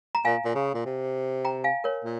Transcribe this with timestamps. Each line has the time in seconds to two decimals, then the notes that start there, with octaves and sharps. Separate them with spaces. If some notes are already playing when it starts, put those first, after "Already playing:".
0.15 A#5
0.25 A#2 F5 G#5
0.45 A#2
0.55 C#3
0.74 A#2
0.85 C3
1.45 G5 A#5
1.64 F5 G#5
1.84 A#4 C#5
2.05 A#2